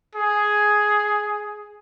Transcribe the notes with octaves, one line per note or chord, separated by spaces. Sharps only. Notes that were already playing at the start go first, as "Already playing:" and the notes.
G#4